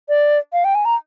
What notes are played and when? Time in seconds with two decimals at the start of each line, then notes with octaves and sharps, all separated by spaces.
0.09 D5
0.53 F5
0.64 G5
0.75 G#5
0.85 A#5